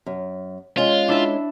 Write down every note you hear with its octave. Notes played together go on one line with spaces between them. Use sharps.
F#2
G#3 C#4 F4
D4 E4 E5